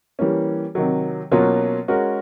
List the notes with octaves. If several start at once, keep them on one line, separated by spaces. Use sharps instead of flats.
E3 G3 A#3 C#4
C3 D#3 F#3
B2 F#3 A#3 C#4 F4
G#3 C#4 F#4 A#4